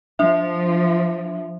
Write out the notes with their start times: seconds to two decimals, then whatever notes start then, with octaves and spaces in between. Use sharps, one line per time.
0.19 F3 D4 E5